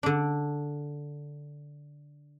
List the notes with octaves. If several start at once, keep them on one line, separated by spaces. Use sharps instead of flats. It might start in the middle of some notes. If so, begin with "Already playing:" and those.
D3 D4